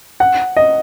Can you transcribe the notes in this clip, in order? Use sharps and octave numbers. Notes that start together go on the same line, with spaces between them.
F#5
D#5